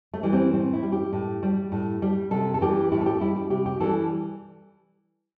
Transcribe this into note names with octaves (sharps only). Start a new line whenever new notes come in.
A3
E3 G3
C4
A2 C4
E4
G3
G4
A2
G3
A2
G3
C3 A4
A4
E3 G3 G4
A2 E4
A4
G4
G3 E4
G4
C3 G4
G4
E3 G3 A4